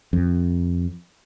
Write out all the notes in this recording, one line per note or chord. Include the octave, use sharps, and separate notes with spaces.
F2